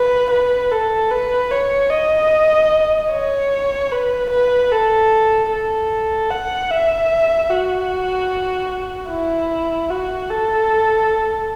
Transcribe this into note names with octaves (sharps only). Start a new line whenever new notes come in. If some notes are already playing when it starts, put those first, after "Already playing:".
Already playing: B4
B4
A4
B4
C#5
D#5
C#5
B4
B4
A4
A4
F#5
E5
F#4
E4
F#4
A4